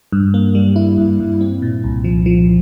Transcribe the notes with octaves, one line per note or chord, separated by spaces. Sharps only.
G2
A#3
G3
E4
G2
G2
C4
A#2
C2
F3
F3